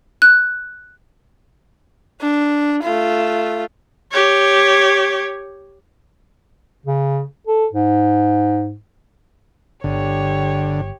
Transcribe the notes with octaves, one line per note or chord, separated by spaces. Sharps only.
F#6
D4
A3 F4
G4 C#5
C#3
A4
G#2
G1 D3 G4 C#5